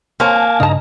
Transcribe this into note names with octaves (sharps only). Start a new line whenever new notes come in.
A#3 C4 C#5 G#5 A5
G2 C#3 D4 D#4 D#5 A5 A#5